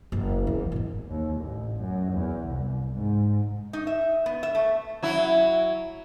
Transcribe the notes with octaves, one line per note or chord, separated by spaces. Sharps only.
F#1
E2
G#1 G#2
D#2
A1
F#2
E2
C2
G#2
D#4
E5
B3
E5
A3
F#3 E4